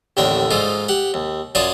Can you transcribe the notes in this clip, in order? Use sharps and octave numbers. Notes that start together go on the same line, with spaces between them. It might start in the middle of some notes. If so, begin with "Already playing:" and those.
A1 D#2 A2 D3 A#4 G5
G#2 D#4 F4 A4
G4 F#5
D#2
F#2 F4 C#5 D5 A5 D#6